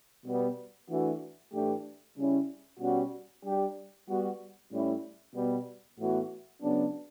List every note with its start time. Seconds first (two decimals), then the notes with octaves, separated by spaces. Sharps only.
0.25 B2 G3 B3
0.89 E3 A3 D4 F#4
1.53 A2 E3 A3 D4 G4
2.16 C#3 G3 C#4 E4
2.80 B2 G3 C#4 F#4
3.44 G3 D4 G4
4.08 G3 B3 F#4
4.71 A2 G3 C#4 E4
5.35 B2 G3 B3
5.98 A2 E3 B3 F#4
6.62 C#3 F#3 B3 D4